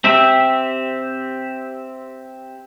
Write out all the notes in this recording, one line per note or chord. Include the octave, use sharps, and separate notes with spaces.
C4 G4 E5